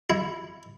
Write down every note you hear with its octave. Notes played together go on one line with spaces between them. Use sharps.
E4